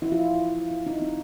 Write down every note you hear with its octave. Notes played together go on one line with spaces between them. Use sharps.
E4
F4
E4
D#4
C4